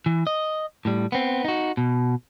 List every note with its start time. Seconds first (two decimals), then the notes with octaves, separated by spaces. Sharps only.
0.06 E3
0.27 D#5
0.85 A2 G3
1.12 B3 C4
1.45 D#4 F#4
1.77 B2